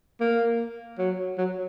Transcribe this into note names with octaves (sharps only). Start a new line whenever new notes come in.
A#3
F#3
F#3